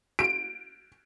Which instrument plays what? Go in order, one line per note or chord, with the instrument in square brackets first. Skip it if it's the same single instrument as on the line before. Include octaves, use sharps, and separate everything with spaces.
[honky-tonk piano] D7